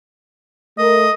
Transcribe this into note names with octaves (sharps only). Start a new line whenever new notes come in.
A3 A#4 D#5